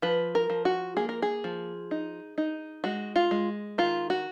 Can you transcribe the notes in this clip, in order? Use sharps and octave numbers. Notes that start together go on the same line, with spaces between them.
F3 B4
A#4
F3
F#4
A#3 G#4
A#4
G#4
F3
D#4
D#4
G#3 F#4
F4
G#3
D#3 F4
F#4